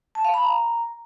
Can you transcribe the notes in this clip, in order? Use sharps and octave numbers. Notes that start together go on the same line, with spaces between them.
A5
F5
B5
A#5